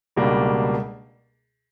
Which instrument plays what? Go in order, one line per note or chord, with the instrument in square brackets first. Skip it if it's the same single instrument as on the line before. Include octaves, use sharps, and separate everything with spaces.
[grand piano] C#2 B2 G3 A#3 D4